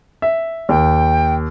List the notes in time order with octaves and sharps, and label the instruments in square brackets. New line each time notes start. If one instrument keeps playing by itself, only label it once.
[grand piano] E5
[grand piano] D#2 [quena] G5